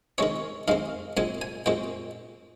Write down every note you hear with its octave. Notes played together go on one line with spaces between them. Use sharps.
D#3 G#3 C4 C#5
D#3 G#3 C4 F5
A#2 G#3 C4 G#5
G#5
A#2 G#3 C4 G5